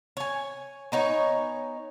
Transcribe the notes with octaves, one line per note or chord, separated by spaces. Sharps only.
C#5 G#5
B3 D#4 C#5 G#5